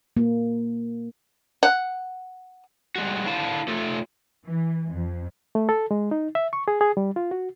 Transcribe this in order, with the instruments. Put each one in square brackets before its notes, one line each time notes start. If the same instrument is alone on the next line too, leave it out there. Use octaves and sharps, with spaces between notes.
[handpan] A#3
[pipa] F#5
[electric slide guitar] G3 G#3 F#4
D3 E4 F5 A5
A3 F4 A4
[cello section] E3
F2
[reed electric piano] A3
A4
G#3
D#4
E5
C#6
G#4
G#4
G3
F4
F#4